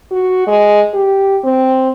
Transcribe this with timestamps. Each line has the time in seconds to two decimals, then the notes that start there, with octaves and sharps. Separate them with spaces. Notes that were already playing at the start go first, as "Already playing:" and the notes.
0.11 F#4
0.47 G#3
0.94 G4
1.44 C4